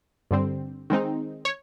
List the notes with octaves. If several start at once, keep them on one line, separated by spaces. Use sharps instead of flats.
G2 D3 G3 C4
D#3 G#3 C4 D#4
C#5